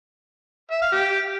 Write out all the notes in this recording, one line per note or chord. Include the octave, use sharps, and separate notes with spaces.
E5
F5
G4